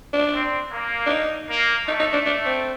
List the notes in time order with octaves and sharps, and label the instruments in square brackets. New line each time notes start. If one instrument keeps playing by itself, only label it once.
[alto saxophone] D4
[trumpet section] C4
A#3
[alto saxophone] D4
D#4
[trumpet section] A#3
[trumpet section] A3 [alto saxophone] D#4
[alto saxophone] D#4
D4
D4
C4